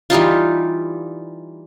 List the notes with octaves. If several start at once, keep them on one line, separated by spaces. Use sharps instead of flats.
E3 G3 D#4 F4